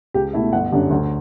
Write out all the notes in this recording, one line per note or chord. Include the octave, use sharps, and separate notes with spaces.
C#2 G4
B2 A3 E4 E5
G1 F#5
F#2 D3 G3
D2